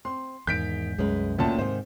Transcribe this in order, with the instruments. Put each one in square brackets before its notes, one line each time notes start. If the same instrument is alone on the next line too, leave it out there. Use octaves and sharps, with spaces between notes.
[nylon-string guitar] C4 [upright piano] C6
[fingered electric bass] E2 G#2 [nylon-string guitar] D#3 [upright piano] G6 B6 D7
[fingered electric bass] C2 F#2 [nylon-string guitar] G#3 C#4 B4
[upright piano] D2 A#2 A5 [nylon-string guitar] C#4 G5
[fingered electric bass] G#2 [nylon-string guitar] C3 D#3 [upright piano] C5